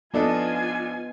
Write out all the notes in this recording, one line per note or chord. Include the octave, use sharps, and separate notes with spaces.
F2 B3 D4 F4 A4 D#5 G#5